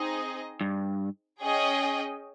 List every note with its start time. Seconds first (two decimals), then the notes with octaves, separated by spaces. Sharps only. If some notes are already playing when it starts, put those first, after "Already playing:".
Already playing: C4 D#4 G#4 D#5
0.61 G2
1.41 C#4 G#4 D#5 G5